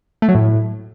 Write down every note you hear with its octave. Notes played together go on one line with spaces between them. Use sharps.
A3
F#3
A2